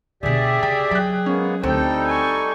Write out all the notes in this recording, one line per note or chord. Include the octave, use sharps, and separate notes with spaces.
B2 D3 G4 G#4 D5 E5
C#3 G5
F#3 G5 F#6
G#3 A#3 B3 C#4
D2 G3 C4 D#4 A4 G5
G#5 C#6